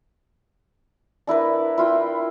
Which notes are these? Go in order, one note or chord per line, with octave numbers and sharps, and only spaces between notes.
D4 E4 A#4 B4
E4 F4 G5